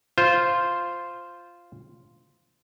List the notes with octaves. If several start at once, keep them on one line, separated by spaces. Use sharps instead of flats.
F4 C5